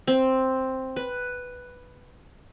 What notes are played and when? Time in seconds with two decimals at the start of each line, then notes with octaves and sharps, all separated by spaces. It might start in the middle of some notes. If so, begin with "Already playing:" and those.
0.07 C4
0.96 B4